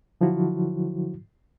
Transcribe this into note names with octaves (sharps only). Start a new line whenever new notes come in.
D3 F3 F#3 E4 F#4